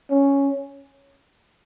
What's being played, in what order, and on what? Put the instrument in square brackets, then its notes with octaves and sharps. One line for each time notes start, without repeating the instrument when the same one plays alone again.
[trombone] C#4